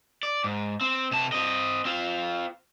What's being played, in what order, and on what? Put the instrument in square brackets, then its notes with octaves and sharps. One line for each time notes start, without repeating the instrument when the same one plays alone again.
[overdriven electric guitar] D5
G#2
C4
C3 A5
C4 D#5
C4 F4